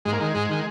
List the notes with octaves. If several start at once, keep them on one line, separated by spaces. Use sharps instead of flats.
G#2 G#3
A#3
D#3 G#3
G#2
D#3